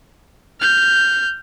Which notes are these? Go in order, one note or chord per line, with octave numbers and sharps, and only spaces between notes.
F6 G6